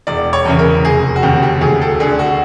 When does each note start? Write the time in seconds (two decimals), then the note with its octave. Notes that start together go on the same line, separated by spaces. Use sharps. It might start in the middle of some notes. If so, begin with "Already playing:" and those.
0.07 E1 D5
0.33 C#5
0.45 E2 C#3 E3
0.59 A#4
0.85 F1 G#4
1.16 F#4
1.22 D#2 C#3 G4
1.43 G4
1.61 D2 G#4
1.82 A4
2.00 D3 G#4
2.19 F#4